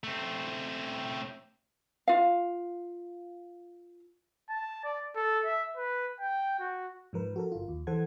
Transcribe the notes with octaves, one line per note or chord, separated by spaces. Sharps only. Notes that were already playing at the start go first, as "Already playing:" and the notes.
A3 C4
F4 F5
A5
D5
A4
E5
B4
G5
F#4
G#2 F3 A#4 B4
F#4 A4 A#4
G1 F4
D#2
E3 A4 C5 F#5 G#6